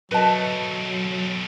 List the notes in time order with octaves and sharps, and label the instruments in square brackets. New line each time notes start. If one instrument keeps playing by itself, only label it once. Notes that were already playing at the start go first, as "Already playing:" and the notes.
[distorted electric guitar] B2 A3 [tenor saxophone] F#3 [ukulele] B4 D#5 A5